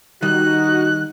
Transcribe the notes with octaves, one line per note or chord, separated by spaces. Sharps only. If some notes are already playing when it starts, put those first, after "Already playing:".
D#3 G3 D#4 F#4 F#6